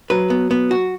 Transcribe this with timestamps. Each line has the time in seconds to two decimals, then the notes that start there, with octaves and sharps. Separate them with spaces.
0.10 F#3 B4
0.30 B3
0.51 B3
0.71 F#4